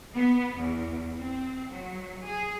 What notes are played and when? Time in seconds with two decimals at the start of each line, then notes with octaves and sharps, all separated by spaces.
0.15 B3
0.57 E2
1.19 C4
1.72 F#3
2.23 G#4